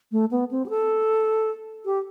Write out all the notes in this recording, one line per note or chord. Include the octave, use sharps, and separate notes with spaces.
A3
B3
C4
G4
A4
G4